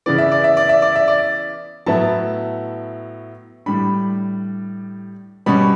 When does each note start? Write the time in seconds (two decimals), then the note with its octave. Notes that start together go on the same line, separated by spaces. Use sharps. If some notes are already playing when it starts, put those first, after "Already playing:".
0.06 C#3 E3 B3 D5
0.18 E5
0.32 D5
0.44 E5
0.57 D5
0.69 E5
0.82 D5
0.96 E5
1.08 D5
1.86 A2 F#3 B3 E4 A5
3.66 A2 G3 D4 B5
5.46 B2 G3 C#4 B5